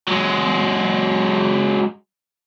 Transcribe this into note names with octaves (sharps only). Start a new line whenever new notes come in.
F#3 G#3